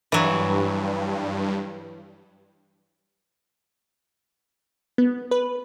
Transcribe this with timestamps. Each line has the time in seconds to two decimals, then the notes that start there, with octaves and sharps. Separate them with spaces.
0.12 G2 E3 F#3
4.98 B3
5.31 B4